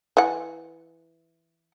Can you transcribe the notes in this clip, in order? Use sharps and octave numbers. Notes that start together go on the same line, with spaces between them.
E3 F#5